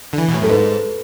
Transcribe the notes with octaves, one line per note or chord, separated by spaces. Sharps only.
D3
E3
B2
A2
F#2 A4
G#2 B4